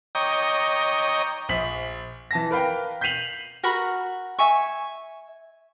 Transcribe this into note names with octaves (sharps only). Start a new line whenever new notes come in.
C#5 D#5 G5 A#5 D6
A#1 B6 F#7
E3 A5 A#6
A#4 B4 F5 G5
G6 B6 C7 D#7 F7 F#7
F#4 A#4 B5 C#6
E5 G#5 C#6